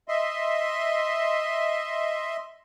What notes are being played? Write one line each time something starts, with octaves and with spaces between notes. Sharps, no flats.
D#5 E5 C6